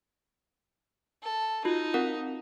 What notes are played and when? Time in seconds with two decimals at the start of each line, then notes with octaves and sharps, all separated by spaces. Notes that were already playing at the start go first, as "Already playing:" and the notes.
1.23 A4
1.65 D#4 F4 F#4
1.94 C4 A#4 F#5